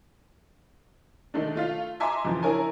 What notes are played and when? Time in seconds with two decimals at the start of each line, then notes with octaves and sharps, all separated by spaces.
1.34 D#3 G#3 A3 D4
1.55 A3 F4 F5
2.00 D#5 E5 G#5 A#5 C6 D6
2.25 F2 C#3 E3 F3
2.42 D4 E4 A#4 C#5 G#5 A#5